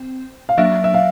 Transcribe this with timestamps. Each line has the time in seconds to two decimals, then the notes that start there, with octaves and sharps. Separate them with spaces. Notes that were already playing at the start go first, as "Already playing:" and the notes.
Already playing: C4
0.49 F5
0.57 F#3 A#3 D4 E5
0.84 E5
0.94 F5